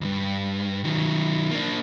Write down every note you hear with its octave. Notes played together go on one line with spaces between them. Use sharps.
C#2 G2
D#3 F#3
A#3 D4